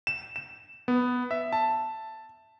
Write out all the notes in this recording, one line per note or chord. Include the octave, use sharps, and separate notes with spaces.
E7
E7
B3
E5
A5